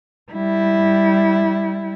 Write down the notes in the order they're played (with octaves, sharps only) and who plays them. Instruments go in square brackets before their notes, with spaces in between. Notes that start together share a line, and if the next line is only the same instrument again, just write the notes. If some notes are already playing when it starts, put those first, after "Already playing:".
[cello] G3 E4